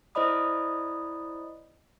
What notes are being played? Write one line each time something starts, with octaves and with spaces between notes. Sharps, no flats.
E4 C5 D5 D#5 B5 D#6